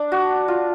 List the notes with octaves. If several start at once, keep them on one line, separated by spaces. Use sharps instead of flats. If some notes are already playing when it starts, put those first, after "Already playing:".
Already playing: D4
F#4
F4